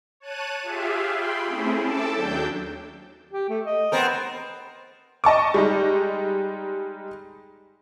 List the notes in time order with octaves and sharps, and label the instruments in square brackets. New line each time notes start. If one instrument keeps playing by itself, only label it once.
[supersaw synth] C#5 A5 F#6 D#7
F4 G4 G#4 E5 F5
G5 B5 C6
A3 C4 C#4 E4 G#4
A4 A5 D6 E6
D#2 F#3 D4 G5 G6
[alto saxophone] G4
A3
D#5
[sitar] B3 C4 A#4
[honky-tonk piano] D#5 A5 C#6 D6
G3 G#3 D#4